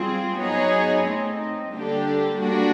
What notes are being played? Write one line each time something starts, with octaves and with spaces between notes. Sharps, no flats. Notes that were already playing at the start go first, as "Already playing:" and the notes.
Already playing: G3 C4 F4 G#4
F#3 B3 D#4 G#4 C#5
A3 C4 D#4
D3 G3 A#3 D4 G4
G3 A#3 D4 F#4